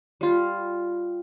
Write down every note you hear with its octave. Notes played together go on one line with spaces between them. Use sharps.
G3 F4